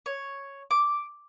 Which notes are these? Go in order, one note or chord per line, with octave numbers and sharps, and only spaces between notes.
C#5
D6